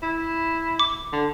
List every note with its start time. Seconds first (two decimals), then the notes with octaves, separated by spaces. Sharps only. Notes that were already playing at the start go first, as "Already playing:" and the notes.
0.02 E4
0.79 D6
1.12 D3